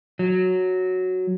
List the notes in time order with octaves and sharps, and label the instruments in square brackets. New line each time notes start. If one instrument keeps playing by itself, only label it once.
[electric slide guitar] F#3